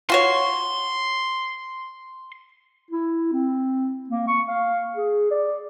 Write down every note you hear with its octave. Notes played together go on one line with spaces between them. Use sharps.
F4 F#4 C#5 C6
E4
C4
A#3
C#6
F5
G#4
D5